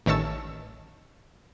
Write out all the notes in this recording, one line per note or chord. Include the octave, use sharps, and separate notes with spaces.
A1 D#3 C#5 A5 E6